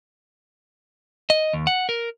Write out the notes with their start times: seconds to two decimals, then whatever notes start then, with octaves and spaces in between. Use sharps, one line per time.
1.30 D#5
1.53 D#2
1.67 F#5
1.89 A#4